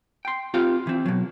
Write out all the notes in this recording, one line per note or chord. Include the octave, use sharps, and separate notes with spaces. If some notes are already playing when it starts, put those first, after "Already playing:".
G5 C6
C4 F4 G4 F5 G5
E3 C4
B2 F#3